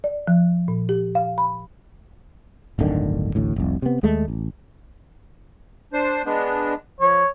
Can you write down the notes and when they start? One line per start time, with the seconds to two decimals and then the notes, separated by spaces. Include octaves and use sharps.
0.04 D5
0.27 F3
0.68 A#2
0.89 G4
1.15 F5
1.38 B5
2.79 D1 G1 D3 D#3
3.35 A1 D2 A2
3.56 F1 C2
3.82 C3 B3
4.03 D#2 G#3 A3
4.28 A1
5.93 D4 C5
6.26 G#3 B3 D4
7.01 F3 C#5